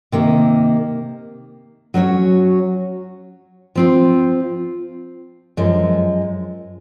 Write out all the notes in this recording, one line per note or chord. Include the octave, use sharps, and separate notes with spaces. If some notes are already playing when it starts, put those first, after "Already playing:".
C3 D#3 A#3
F#3 C#4 F#4 C#5
F3 C4 F4
F#2 F3 G#3